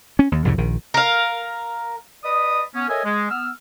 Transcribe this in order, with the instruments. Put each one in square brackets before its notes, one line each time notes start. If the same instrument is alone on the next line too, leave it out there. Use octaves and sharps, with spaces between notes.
[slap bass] C#4
D#2
C2 F2 A2 C#3
A#1 D#3
[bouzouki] A#4 F5
[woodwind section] B4 D5 D#5 B5 D#6
B3 C#4
A4 A#4 C#5 D#5 E5 G#5
G#3
B3 E6 F6